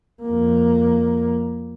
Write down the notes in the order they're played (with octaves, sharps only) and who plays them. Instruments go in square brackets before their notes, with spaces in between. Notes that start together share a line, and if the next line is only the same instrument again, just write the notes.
[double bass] F2 A#3